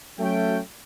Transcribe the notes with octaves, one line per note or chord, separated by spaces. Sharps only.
F#3 A3 C#4 G5